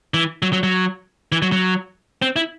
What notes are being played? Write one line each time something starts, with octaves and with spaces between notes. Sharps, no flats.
E3
F#3
F#3
F#3
E3
F#3
F#3
C4
E4